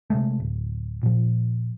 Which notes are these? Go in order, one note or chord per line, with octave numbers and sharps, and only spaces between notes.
C3 F3 G#3 A3
D1
A#2 F3